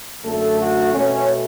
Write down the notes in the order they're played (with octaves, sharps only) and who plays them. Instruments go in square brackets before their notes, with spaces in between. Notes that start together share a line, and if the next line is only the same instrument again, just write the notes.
[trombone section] F#2 D3 A3 A4
F#4
B2 A3 C#4